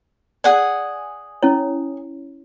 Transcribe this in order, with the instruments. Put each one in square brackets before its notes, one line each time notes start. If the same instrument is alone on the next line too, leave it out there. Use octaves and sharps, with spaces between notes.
[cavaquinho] G#4 F#5 G#5 [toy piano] D5
[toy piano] C#4 E4 C#5